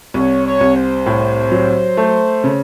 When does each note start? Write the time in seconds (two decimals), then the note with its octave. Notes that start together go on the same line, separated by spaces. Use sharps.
0.14 C2 C#5
0.45 C#5
0.61 C2
0.75 C5
1.06 A2
1.52 F#3
1.97 A3
2.44 C#3